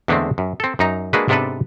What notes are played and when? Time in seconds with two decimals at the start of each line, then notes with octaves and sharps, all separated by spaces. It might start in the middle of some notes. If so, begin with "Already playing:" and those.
0.08 E2 D3 G#3 A3 C4
0.38 F#2
0.60 C4 A4
0.79 F#2 D#4 A#5
1.13 G#3 A#3 D4 F#4 G#4 B4
1.28 G#2 C3 B3 D4 A4 B4